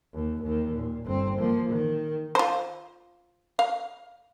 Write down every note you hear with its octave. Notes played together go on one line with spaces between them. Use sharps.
D#2
D#2 D#3
A#2
G1 C4
F3 A#3
D#3
F4 C5
F5